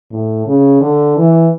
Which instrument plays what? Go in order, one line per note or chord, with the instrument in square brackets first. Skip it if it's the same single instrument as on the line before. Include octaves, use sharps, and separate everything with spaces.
[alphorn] A2
C#3
D3
E3